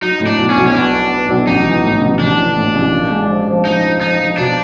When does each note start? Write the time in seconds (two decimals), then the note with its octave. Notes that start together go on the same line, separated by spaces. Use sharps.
0.01 F#3 D#4
0.20 A2
0.27 D4
0.38 B1
0.50 C#4
0.57 B1
0.67 C#4
0.75 B3 D4
0.92 B3
1.11 B3
1.29 B1
1.47 A1 D#4
1.66 E3
1.84 A2
2.01 A1
2.19 A1 D4
2.38 E3
2.55 A2
2.75 A1
2.92 A#2
3.10 G#3
3.28 F3
3.47 F3
3.65 F3 D#4
3.83 F3
4.01 F3 D#4
4.19 F3
4.37 B2 D4